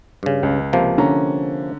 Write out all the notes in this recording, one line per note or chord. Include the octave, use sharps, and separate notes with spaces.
G2 C#3
C#2
C3 F3 A#3
D3 C#4 A#5